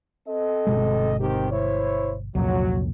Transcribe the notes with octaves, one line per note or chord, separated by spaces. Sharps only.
C4 A4 D#5
G1 B2 G#3
D#3 C4 G4
E4 C5 C#5
C2 F2 A#2 F#3